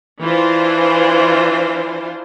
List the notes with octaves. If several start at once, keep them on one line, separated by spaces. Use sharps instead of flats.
E3 D4 F4 C5